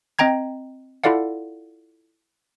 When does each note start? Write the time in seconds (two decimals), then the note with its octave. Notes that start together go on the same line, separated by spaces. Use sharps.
0.19 C4 D#5 G5 A#5 G#6
1.04 E4 F4 A4 D5 F5 F#5